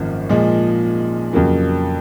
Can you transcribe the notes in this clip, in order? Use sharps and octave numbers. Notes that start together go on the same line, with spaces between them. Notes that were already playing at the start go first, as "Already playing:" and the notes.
Already playing: G#1 F#2 F3 A#3
A#2 F3 G#3
F2 C#3 F#3 A#3